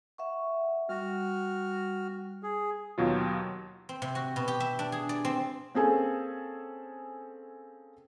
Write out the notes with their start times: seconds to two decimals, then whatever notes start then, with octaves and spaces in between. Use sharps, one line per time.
0.18 E5 F#5 C#6
0.89 G3 F#4 F6
2.43 G#4
2.98 D#2 B2 F#3 F4
3.89 C4
4.02 C3
4.15 F#4
4.36 B2
4.48 G4
4.60 E5
4.79 D4
4.92 G#4
5.09 D5
5.25 C4
5.74 A#3 C4 C#4 G#4 A4 G#5